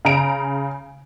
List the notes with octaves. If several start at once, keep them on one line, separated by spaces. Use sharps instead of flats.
C#3 A#5 D7